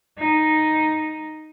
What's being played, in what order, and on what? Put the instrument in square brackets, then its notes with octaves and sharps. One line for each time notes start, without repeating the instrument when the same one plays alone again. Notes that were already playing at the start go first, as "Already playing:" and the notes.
[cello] D#4